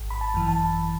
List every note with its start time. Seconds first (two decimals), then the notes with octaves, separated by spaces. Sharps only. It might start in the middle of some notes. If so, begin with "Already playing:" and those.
Already playing: G#1
0.10 B5
0.21 A5
0.34 F#2 E3
0.48 A5